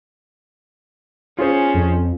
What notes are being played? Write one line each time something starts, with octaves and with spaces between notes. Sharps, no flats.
C#4 F4 G#4 C5
F2